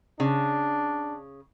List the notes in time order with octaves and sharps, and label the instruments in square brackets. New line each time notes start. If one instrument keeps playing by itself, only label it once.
[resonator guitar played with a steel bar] C#3 [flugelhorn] D4